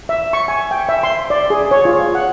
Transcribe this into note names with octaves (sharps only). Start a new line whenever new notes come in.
E5
C#6
G#5
G5
E5
C6
D5
G#4
C#5
F4
F#5